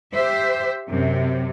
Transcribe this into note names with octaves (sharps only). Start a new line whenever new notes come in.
G4 C5 E5
F#2 C3